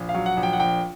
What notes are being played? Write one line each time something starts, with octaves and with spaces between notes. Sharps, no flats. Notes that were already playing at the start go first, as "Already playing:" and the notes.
Already playing: A#1
F5
F#3
F#5
A#1
G5
F#5
A#1 G5